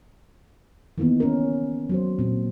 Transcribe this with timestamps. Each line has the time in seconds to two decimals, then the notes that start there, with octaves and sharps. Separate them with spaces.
0.98 D#3 E3 A#3 B3 D#4
1.20 C#4 A#4
1.89 F#3 F#4 C5
2.19 A#2 C4